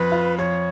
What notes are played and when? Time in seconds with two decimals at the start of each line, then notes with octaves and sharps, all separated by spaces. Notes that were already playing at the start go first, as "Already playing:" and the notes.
Already playing: F2 B4
0.12 F4
0.38 F2 C#5